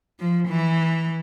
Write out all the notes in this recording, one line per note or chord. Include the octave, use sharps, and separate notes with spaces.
F3
E3